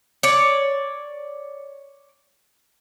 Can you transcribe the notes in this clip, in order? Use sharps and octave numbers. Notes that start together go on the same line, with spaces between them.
C#5 D5